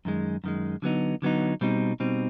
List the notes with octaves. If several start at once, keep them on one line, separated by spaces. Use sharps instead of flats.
F#2 D#3 G#3
F#2 D#3 G#3
D3 F#3 B3 D#4
D3 F#3 B3 D#4
B2 G3 C4 D#4
B2 G3 C4 D#4